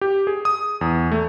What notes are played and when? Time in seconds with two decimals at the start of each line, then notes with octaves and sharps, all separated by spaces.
0.01 G4
0.27 G#4
0.45 D#6
0.81 E2
1.12 A3